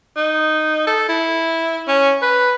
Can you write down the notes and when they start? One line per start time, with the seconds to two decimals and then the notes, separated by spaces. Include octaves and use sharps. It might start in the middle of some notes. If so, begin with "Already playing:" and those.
0.16 D#4
0.87 A4
1.08 E4
1.88 C#4
2.22 B4